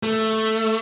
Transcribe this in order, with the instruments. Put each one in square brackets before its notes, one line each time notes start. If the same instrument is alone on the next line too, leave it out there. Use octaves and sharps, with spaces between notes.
[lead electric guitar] A3